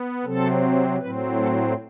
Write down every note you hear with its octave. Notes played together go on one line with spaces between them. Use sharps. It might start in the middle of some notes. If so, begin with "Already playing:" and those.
Already playing: B3
C3 F#3 C4 A4
A2 F#3 C4 B4
A4